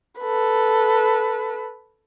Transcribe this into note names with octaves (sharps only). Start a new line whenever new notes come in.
A4 B4